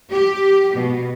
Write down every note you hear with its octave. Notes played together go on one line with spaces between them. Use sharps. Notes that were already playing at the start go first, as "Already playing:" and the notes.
G4
B2